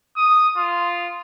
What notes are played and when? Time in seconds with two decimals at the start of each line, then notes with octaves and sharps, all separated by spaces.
0.17 D#6
0.57 F4